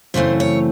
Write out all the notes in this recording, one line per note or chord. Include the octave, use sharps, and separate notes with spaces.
F#2 C#3 E3 A3 C4 C5
C#5